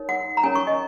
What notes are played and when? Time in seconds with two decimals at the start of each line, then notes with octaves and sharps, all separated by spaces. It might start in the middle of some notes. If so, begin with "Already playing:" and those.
Already playing: D#4 A#4 C#5
0.09 F#5
0.37 A#5
0.43 C#4 A#4 C#5 G#5
0.55 C#6
0.67 D#5